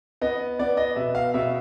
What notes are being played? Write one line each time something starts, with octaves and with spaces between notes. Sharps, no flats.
B3 D#5
B3 D5
D#5
B2 E5
F5
B2 E5